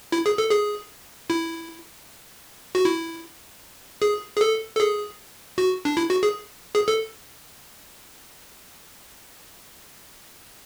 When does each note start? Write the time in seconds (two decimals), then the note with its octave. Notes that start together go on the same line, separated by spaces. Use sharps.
0.12 E4
0.26 G#4
0.38 A4
0.51 G#4
1.30 E4
2.75 F#4
2.85 E4
4.02 G#4
4.36 G#4
4.41 A4
4.76 A4
4.80 G#4
5.58 F#4
5.85 D4
5.97 E4
6.10 F#4
6.23 G#4
6.75 G#4
6.88 A4